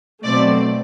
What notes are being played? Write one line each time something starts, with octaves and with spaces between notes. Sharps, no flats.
B2 F#3 A3 C4 D5